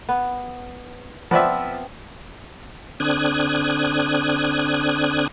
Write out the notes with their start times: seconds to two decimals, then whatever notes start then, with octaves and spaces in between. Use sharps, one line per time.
0.09 B3
1.31 F3 B3 C4 D5 E5
3.00 D3 C4 D4 D#6 F#6 G#6